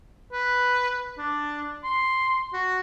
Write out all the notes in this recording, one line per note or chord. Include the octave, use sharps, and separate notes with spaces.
B4
D4
C6
F#4